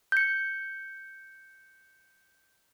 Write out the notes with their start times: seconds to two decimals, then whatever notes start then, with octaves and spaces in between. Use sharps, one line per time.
0.12 G6 C#7